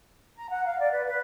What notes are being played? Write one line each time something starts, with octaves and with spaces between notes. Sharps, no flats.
A#5
F#5
F5
D5
B4
B4